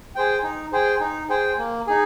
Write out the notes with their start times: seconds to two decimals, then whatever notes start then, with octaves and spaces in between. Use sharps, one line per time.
0.15 G#4 C5 G5
0.43 D#4
0.73 G#4 C5 G5
1.01 D#4
1.29 G#4 C5 G5
1.58 A#3
1.87 D#4 G#4